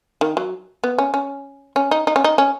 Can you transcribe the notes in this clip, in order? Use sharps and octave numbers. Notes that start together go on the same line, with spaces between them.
D#3
F#3
B3
C#4
C#4
C#4
D#4
D#4
C#4
D#4
C#4